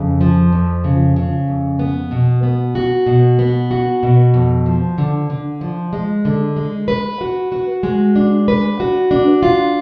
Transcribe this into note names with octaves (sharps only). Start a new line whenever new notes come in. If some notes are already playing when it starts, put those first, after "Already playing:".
Already playing: F2 C#3
F3
F2
C#3
C#3
F2
B3
B2
B3
F#4
B2
B3
F#4
B2
F2
F3
D3
D3
F3
G#3
D3
G#3
B4
F#4
F#4
G#3
D4
B4
F#4
D4
F4